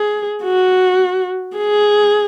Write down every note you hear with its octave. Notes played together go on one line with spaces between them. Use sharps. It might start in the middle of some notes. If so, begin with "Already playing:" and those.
Already playing: G#4
F#4
G#4